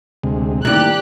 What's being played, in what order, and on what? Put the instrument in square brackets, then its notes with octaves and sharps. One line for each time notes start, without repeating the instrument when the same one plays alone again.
[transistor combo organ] D2 C3 G#3
[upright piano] A2 D#3 [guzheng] C3 G3 [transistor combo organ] A#3 [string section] G4 F#6